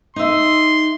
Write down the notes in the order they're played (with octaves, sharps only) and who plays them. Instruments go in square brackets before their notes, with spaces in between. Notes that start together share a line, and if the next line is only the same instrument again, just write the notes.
[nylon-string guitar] D#4 E5 [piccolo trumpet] C6